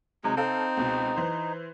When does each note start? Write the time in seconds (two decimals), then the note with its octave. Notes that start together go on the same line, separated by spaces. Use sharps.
0.24 C3 F#3 G#3 D#4
0.37 C4 D#4 A4 F5
0.77 C#2 B2
1.17 E3 C5